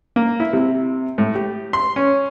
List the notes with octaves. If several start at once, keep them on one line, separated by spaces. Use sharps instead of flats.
A#3
E4
C3
A2
G4
C6
C#4